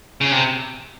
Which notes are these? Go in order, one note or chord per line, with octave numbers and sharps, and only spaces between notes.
C#3
C3